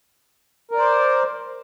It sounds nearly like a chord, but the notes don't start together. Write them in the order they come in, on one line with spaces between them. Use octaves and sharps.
A#4 D5 C5